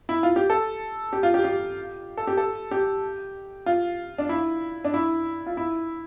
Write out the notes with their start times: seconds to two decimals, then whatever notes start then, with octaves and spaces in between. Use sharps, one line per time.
0.09 E4
0.23 F4
0.36 G4
0.50 A4
1.13 G4
1.23 F4
1.34 G4
1.44 G4
2.17 A4
2.27 G4
2.37 A4
2.71 G4
3.66 F4
4.18 D4
4.29 E4
4.85 D4
4.94 E4
5.46 F4
5.57 E4